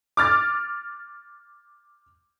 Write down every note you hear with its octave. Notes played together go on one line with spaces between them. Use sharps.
D6 F6 A6